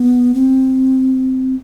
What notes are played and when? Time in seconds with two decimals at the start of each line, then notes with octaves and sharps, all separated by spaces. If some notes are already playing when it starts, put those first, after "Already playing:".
Already playing: B3
0.34 C4